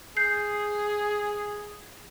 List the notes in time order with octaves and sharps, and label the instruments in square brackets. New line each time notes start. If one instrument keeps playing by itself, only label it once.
[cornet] G#4 [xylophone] G6 C7